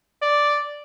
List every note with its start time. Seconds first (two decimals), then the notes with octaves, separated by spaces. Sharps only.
0.22 D5